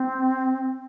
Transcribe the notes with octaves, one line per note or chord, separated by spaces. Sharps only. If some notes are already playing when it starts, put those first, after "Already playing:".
Already playing: C4